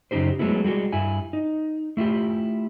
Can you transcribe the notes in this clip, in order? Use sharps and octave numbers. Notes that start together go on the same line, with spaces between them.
F#2 C#3 G3 D#4 G4 C5
F#3 G#3 A3 B3 E4
G3 G#3 F#4 A4
G2 E4 G#5
D#4
A3 E4 F4 G4